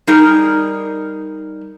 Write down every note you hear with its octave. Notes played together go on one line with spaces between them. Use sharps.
G3 D#4 G#4 A#4